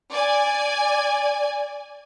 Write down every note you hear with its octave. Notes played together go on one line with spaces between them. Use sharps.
D5 G#5